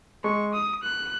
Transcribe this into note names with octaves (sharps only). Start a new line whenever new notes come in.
G#3 C#6
D#6
F#6